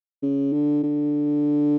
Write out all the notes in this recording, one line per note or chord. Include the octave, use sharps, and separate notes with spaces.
C#3
D3
D3